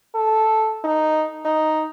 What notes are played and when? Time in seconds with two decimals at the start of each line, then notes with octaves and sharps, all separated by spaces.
0.15 A4
0.84 D#4
1.45 D#4